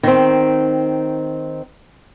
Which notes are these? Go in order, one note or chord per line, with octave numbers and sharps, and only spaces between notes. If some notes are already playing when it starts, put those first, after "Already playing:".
D#3 C4